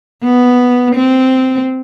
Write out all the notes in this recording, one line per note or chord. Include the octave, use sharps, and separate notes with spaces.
B3
C4